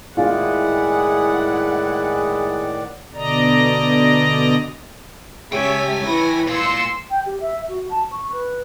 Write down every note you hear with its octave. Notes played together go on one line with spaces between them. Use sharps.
A2 D#3 G#3 E4 F4 G#4 D5 F#5
B2 D3 D5 D#5 A#5
C#2 G4 C#5 E5 G5 G#5 B6
E3 C#5 B5 A#6
A#2 C6 E6 C#7
G5
G4
E5
F#4
A5
C#6
B4